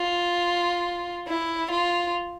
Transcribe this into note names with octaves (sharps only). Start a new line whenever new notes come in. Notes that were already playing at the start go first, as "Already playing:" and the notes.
Already playing: F4
E4
F4